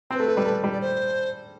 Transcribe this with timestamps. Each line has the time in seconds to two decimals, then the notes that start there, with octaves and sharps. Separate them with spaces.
0.11 C4 C5
0.15 A3 B4
0.28 A3
0.37 G3
0.46 A3
0.64 G3
0.72 D5
0.81 C5